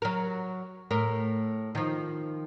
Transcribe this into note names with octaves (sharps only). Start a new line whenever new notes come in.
F#3 A#4
A2 A#4
D#3 F3